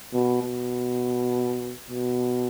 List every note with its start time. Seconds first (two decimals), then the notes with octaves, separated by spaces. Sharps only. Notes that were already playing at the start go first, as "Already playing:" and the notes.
0.13 B2
0.42 B2
1.90 B2